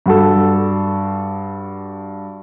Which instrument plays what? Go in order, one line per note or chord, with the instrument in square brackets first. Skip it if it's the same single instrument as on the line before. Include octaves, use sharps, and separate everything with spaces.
[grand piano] G2 F#4 A4